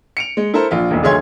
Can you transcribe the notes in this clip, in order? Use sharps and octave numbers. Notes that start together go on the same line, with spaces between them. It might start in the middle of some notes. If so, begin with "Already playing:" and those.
C#7 D7 F7
G#3
E4 A4 A#4 C5
A#1 F4
E1 B1
F1 D2 G#4 C#5 C6 G#6